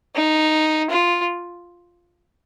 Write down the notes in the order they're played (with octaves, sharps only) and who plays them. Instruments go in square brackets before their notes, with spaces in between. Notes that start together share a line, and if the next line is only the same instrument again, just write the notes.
[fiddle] D#4
F4